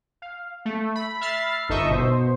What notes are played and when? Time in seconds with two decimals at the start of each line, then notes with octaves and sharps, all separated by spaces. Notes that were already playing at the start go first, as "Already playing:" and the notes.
0.22 F5
0.65 A3
0.95 B5
1.21 E5 B5 F6 A6 C7
1.69 G1 D#4 A4 D#5 E5 C#6
1.90 B2 C5